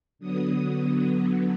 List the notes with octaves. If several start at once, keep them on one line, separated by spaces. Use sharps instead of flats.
D3 F#3 B3 D#6